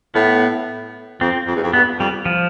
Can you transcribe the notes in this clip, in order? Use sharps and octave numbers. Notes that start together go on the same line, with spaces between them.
A2 B3
F2 C4
F2
E2
F2
G2 B3
F2 G3
F3